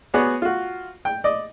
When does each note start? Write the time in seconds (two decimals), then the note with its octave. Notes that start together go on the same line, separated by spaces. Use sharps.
0.14 B3 F#4 G#4 C#5 D5
0.42 F4 F#4
1.05 G5
1.24 D5 D#5